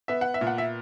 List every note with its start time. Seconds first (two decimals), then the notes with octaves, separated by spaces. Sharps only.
0.08 B3 E5
0.21 F#5
0.34 E5
0.41 A#2
0.47 F#5
0.58 E5